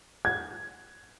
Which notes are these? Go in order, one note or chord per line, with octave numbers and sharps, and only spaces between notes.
G#6